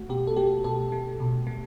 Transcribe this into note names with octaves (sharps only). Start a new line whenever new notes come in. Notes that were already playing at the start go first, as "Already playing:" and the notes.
Already playing: A3 F#4
B2 G4
A4
A3 G4
B2 A4
A3
B2
A3